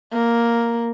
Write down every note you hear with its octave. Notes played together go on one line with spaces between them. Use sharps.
A#3